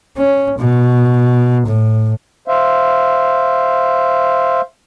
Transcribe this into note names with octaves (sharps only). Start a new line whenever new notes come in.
C#4
B2
A2
C5 E5 F5